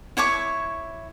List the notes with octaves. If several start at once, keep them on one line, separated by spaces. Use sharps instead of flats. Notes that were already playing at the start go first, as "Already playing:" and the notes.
E4 C#5 C#6 D6